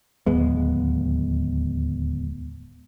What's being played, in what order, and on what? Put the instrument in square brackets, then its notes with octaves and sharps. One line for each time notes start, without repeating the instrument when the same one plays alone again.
[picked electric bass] D1 D#2 G#3 B3